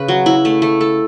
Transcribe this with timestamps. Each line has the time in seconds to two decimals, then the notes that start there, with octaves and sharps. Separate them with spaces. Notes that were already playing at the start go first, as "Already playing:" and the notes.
Already playing: C#3 C#4 B4
0.08 F#3
0.26 E4
0.45 A3
0.62 A3
0.81 A4